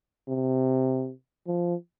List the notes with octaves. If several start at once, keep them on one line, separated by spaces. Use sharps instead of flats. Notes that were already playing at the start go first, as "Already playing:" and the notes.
C3
F3